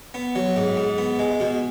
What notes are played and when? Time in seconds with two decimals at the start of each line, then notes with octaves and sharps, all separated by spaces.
0.14 B3
0.36 F#3
0.56 G#2
0.77 G#2
0.98 B3
1.19 G#3
1.40 B2